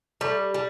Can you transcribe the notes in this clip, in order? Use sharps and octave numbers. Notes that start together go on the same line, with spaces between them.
G3 A3
G3